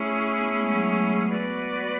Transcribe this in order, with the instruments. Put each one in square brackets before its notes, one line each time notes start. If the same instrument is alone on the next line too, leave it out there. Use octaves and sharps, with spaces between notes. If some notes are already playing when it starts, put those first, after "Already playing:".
Already playing: [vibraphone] A3 [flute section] C#4 E4 G#4
[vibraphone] B3
A3
G#3
F#3
A3
[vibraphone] B3 [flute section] F#4 B4 D5